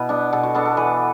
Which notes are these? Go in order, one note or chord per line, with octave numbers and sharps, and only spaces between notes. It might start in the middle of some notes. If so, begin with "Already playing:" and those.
Already playing: B2 E4 B4
B3 D4
B2 A4
F#4
B3 D4 A4
A4
E3 B4